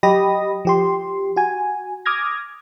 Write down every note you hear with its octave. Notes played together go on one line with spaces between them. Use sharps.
F#3 G4 D#5 B5 D#6 A#6
F3 G4 C6
F#4 G#5
D6 D#6 F6 G#6 A#6